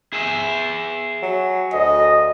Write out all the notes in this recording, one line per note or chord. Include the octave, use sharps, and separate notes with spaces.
G#4 E5
F#3
D2 D#5